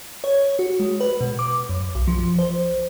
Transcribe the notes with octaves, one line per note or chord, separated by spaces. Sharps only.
C#5
F#4
G#3
B4
B2
D6
F#2
B1
F3
C5